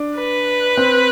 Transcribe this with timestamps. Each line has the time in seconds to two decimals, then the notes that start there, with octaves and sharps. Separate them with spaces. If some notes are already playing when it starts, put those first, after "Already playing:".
Already playing: D4
0.19 B4
0.77 C4